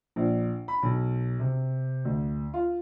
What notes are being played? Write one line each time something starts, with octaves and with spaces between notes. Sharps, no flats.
A#1
B5
B1
C3
D2
F4